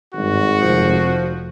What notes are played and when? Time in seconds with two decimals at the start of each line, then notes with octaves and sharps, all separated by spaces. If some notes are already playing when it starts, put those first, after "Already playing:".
0.14 G#1 G2 F#4
0.62 F1 F3